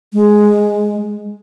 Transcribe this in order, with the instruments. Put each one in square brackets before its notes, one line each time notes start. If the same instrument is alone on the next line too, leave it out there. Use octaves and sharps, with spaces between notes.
[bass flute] G#3